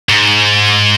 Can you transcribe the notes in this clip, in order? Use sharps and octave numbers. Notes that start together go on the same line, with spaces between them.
G#2